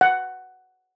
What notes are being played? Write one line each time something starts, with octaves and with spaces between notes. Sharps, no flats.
F#5